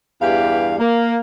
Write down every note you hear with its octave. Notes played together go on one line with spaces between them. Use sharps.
E2 G2 E3 G4 F5
A#3